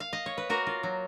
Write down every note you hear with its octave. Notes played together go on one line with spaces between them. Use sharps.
F5
D#5
C#5
B4
A#3 F#4 A#4
F4
F#3